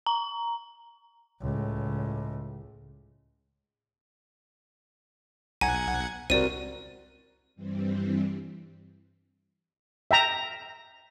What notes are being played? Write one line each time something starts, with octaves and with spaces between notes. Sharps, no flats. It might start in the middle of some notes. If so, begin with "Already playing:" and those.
A#5
C#2 A2
B1 F#5 G#5 A#5 G#6
C2 C4 F#4 A#4 D5 D#7
G2 E3 G3 C4
E5 G5 A#5